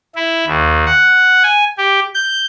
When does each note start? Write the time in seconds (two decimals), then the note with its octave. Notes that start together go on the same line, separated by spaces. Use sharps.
0.15 E4
0.47 D#2
0.86 F#5
1.43 G#5
1.78 G4
2.15 G6